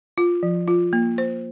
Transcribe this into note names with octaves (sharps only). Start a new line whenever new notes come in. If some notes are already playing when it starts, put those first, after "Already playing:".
F4
F3
F4
A#3
C5